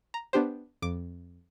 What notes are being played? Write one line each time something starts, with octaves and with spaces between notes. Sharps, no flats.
A#5
B3 D4 G4 C5
F2 D6